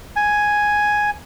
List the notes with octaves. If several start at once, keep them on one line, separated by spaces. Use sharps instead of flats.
G#5